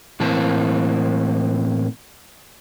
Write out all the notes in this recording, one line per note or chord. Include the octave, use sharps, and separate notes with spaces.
A2 E3 A#3 C4 A5